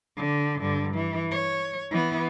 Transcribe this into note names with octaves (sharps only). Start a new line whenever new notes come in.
D3
G2 D3
E3
C#5
E3 B3